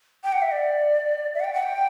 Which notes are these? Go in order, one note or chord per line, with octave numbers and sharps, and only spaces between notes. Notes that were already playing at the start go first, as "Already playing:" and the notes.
G5
F#5
E5
D5
E5
F#5
G5
F#5
G5